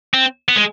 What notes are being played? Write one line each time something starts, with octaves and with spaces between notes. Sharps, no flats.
C4
B3
G#3